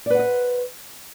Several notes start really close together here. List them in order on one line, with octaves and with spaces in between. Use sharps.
D5 B4 F#5 D#5 C5